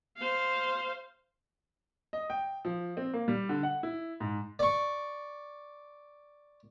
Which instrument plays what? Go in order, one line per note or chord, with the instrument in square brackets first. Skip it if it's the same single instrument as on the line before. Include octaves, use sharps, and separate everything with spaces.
[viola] C5 F5
[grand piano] D#5
G5
F3
C4
A#3
G3
D3
F#5
E4
G#2
[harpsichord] D5 C#6